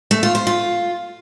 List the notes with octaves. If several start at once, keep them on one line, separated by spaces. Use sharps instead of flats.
A3
F4
C5
F4